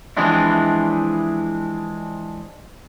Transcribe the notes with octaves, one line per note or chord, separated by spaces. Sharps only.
E3 F3 G#3 C4 D4 E4